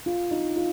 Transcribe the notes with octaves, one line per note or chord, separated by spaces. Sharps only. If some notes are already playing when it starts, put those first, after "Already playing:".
F4
D#4
F4